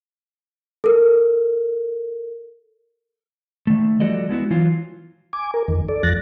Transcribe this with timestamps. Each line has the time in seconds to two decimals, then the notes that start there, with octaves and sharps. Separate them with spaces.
0.84 A4 A#4
3.67 D#3 A3
4.00 F3 G3 F#4 A4 D5 D#5
4.29 G#3 B3 E4 F#4
4.51 E3 F#3 F4
5.33 G#5 D6
5.54 A#4
5.68 F2 D#3
5.89 A4 D5
6.03 F2 F3 F#6 A6 A#6